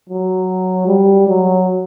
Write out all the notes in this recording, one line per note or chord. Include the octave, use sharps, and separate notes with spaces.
F#3
G3
F#3